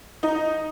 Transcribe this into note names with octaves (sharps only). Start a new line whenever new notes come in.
D#4